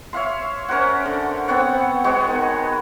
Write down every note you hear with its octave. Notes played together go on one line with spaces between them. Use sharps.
C#5 E5 F5 C6
C#4 A#4 C5 F#5
D3
B3 C4 C#5 F#5
G#3 B3 F#4 C#5
D#3